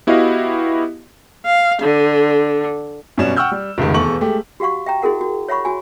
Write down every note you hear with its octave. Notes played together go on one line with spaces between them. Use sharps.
B3 E4 F#4 G4 D#5 F5
F5
D3
F#2 B2 G3 C#4 F#4 E7
F#5 G5 C#6 E6 F6 G6
G3
F1 C#2 A2 D#3
E1 E2 A4 C#6 F#7
G#3 A3 G4
F#4 G4 F5 F#5 C#6
E5 G5 A#5
E4 F#4 G#4 A#4 F#5
F#4
C#5 E5 F#5 B5 C#6
F#4 G#5